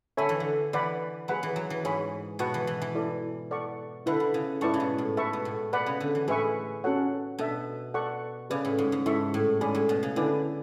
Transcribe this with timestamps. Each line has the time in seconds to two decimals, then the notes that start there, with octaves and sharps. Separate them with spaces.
0.17 D3 A4 C#5 E5 G#5 B5
0.29 E3
0.40 D3
0.73 E3 B4 D5 F#5 B5
1.28 F#3 G#4 B4 F#5 B5
1.43 E3
1.56 F#3
1.70 E3
1.84 G#2 G#4 C#5 G#5 B5
2.39 B2 F#4 B4 F#5 A5 C#6
2.54 E3
2.67 E3
2.82 E3
2.95 E4 A4 D5
3.51 A4 D5 F#5 C#6
4.06 D3 E4 B4 E5
4.20 D3
4.34 C#3
4.61 G#2 E4 B4 D5 A5 C#6
4.74 C#3
4.80 B2
4.98 A2
5.17 G#2 B4 E5 A5 C#6
5.33 B2
5.45 A2
5.73 B2 B4 D5 F#5 B5
5.86 C#3
6.00 D3
6.15 E3
6.28 A2 G#4 B4 E5 G#5 C#6
6.84 C#4 F#4 A4 C#5 F#5
7.39 B2 D4 A4 E5
7.94 A4 D5 F#5 C#6
8.50 C#3 G#4 B4 D5
8.65 A2
8.78 G#2
8.92 G#2
9.05 G#2 E4 A4 E5 A5 C#6
9.34 A2
9.61 G#2 C#4 G#4 D5 G#5 B5
9.75 A2
9.89 B2
10.03 C#3
10.16 D3 E4 B4 D5 G#5